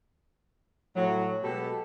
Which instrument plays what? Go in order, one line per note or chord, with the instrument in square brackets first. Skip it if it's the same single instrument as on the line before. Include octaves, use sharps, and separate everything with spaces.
[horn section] A2 F#3
B2 G#3 B3 G4 A4